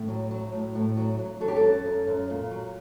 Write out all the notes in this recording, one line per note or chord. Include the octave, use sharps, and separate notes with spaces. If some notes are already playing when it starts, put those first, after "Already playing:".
Already playing: A2
F#3
F#3
A2
A2
F#3
F#3
F#3 A4
G4
A4
F#2
F#2
F#2
A#2
F#3